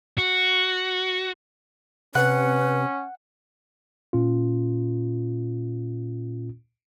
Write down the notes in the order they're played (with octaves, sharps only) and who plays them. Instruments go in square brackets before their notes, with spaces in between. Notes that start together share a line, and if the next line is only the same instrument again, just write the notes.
[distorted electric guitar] F#4
[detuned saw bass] C3 [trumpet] C#4 [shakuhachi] B4 [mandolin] F#5
[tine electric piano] A#2 C#4 F4